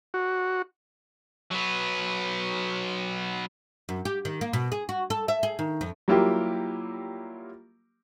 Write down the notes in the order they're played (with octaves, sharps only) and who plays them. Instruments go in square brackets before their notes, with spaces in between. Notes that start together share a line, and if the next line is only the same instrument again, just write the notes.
[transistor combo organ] F#4
[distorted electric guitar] F#3 B3
[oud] F#2
G4
D#3
A#3
B2
G#4
F#4
A4
E5
G#4
D#3
F2
[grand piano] F#3 G3 A#3 E4 F4 G4